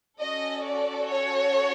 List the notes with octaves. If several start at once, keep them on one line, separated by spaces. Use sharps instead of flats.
C#4 F#4 A4 D#5
D5
C#5